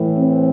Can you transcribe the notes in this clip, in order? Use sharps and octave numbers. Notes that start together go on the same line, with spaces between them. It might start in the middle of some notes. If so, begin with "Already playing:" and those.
Already playing: A2 E3
C4